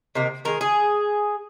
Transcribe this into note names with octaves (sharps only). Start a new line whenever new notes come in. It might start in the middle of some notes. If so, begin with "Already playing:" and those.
C3 D#3 A#3
D#3 G#3 A#4
G#4